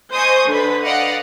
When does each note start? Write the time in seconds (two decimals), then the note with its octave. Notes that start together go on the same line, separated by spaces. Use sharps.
0.14 C5 D#5 G#5 C#6 D#6
0.48 D3 B4
0.85 D5 D#5 F5 F#5